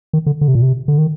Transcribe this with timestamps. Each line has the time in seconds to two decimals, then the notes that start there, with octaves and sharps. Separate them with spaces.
0.13 D#3
0.26 D3
0.41 D3
0.48 C3
0.55 A#2
0.62 C3
0.88 D3
0.98 D#3